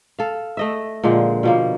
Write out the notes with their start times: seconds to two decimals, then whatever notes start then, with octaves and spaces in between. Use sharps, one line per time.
0.19 A4 F5
0.57 A3 D#5 E5
1.04 A#2 D3 F3 G#3
1.43 B2 F3 A#3